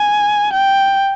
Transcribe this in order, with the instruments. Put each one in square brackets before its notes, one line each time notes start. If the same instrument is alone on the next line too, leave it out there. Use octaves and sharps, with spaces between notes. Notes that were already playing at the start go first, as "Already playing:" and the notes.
Already playing: [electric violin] G#5
G5